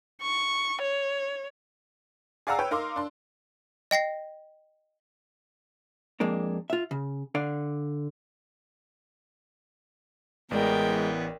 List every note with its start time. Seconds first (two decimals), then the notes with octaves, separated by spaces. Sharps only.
0.22 C#6
0.82 C#5
2.47 G#4 D5 F5 F#5 A#5 E6
2.59 B4 C#5 G5
2.71 D#4 A#4 F5 C6 D6
2.96 D4 C6
3.91 D#5 G5 A#6 C7
6.20 F2 G#3 A#3 D4
6.70 F4 E5
6.91 C#3
7.35 D3 D5 F5
10.51 A1 E3 G#3 B3 A#4 D5 G5